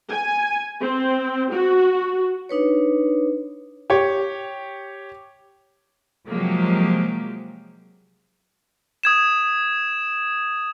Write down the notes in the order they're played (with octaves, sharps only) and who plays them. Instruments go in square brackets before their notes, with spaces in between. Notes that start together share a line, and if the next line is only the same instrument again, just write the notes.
[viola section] G#5
C4
F#4
[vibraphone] D4 D#4 B4 C#5
[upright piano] G4 C#5
[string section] C3 F3 F#3 G#3 A#3 G4
[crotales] D#6 G#6 E7